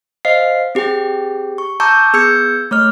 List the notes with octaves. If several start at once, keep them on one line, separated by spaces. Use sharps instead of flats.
C5 D#5 F5 C7
C4 G4 G#4 G5
C#6
A5 A#5 C#6 D6 E6 G6
B3 G#4 E6 G6 G#6 C#7
A3 C#5 F6